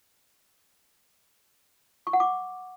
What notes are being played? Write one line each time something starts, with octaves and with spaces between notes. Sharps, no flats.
C#6
F#5
D6